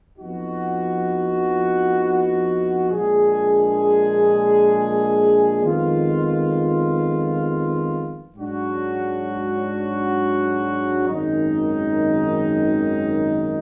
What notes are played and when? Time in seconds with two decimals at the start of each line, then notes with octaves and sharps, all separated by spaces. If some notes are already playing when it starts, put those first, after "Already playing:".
0.18 F2 F3 B3 D#4 F#4
2.90 A#1 A#2 G#3 D4 G#4
5.64 F2 D#3 G#3 B3 F4
8.37 G#2 F#3 D4 F#4
11.09 G#1 F#2 D#3 G#3 D#4